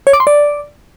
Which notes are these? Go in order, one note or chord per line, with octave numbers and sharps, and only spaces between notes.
C#5
D6
C6
D5